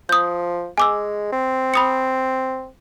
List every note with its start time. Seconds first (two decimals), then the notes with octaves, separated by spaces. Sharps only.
0.09 F3 D#6 G6
0.78 G#3 G#5 D6 E6
1.33 C4
1.74 B5 D#6 C#7